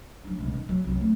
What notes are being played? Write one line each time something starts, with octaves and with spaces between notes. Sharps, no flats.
F#3 D4
C#2 B2
D#3
F#3
C2 F#2
A3 C4